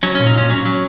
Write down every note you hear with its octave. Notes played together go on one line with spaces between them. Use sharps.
F#3 C#4
A#2 C#4
D#4
A#2 C#4
F#3 C#4
F#3